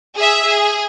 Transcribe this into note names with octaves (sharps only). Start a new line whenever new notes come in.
G#4 E5
G#4